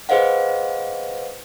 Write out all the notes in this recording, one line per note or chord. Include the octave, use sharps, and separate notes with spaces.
G#4 B4 C5 D#5 F5 F#5